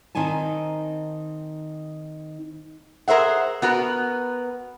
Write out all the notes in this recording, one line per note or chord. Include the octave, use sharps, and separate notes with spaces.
D#3 C4 D#4 G#5 A5
G#4 A#4 C5 E5 F#5
B3 F#4 A#4 B4